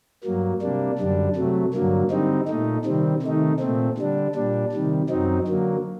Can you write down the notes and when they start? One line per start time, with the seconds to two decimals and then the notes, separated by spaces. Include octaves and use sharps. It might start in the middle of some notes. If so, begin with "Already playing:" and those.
0.24 G2 F#3 A#3
0.61 C3 G3 A#3 D4
0.98 F#2 D3 G3 D4
1.36 C3 F#3 A3
1.74 G2 D3 F#3 A#3
2.10 D3 G3 C4 D#4
2.48 A#2 A3 D#4
2.85 C3 D#3 G3 C4
3.22 C3 D#3 A3 D#4
3.60 A#2 A3 C4
3.97 D3 G3 D4
4.35 A#2 G3 D4
4.72 C3 D#3 G3
5.10 F#2 F#3 C4 D#4
5.47 D3 F#3 A#3